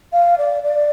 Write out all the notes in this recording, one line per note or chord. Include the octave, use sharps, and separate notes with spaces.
F5
D5
D5